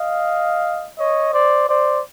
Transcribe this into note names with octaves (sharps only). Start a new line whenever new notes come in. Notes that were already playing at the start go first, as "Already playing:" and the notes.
Already playing: D#5 F5
C#5 D#5
C5 D5
C5 D5